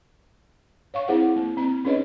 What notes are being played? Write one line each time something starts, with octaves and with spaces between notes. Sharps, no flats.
C#5 F5 C#6
C4 E4 G#4 C5 F#5
A#3
C4 A#5
C#4 D#4 G#4 B4 C#5 D#5